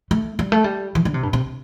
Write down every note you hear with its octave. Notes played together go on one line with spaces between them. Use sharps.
A3
G3
A3
G3
E3
D3
C3
G2
C3